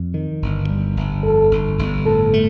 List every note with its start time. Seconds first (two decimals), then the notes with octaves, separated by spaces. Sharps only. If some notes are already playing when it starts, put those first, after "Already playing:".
Already playing: F2
0.14 D#3
0.42 G1
0.70 G3
0.97 G1
1.23 F2 A4
1.51 G1
1.79 G1
2.06 A2 A4
2.33 A3